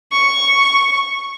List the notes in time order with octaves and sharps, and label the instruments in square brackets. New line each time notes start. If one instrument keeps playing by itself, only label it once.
[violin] C#6